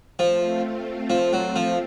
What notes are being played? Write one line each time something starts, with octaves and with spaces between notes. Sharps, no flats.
F3 A3 C4 F4
F3
F#3
F3